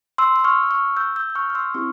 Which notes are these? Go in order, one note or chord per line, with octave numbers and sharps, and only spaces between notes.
C6 E6
E6
C#6 F6
E6
C#6 F6
E6 G6
E6 G6
G6
C#6 F6
F6
C6 E6
C4 E4 G4 C#6 F6